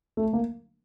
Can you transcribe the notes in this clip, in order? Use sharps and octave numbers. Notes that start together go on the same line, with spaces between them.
A3
A#3